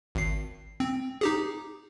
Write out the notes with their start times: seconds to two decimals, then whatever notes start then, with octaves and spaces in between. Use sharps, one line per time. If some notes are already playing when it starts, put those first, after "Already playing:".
0.15 G#1 C7
0.80 C4
1.21 D#4 G4 G#4